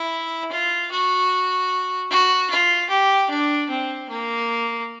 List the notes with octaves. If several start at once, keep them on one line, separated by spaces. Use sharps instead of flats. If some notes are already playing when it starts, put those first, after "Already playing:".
Already playing: E4
F4
F#4
F#4
F4
G4
D4
C4
A#3